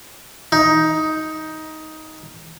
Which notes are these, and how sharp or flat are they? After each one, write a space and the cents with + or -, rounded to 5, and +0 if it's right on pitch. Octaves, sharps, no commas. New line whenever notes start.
D#4 +10